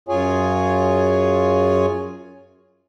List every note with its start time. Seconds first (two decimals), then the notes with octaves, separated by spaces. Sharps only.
0.09 F#2 F4 G#4 C#5 G#5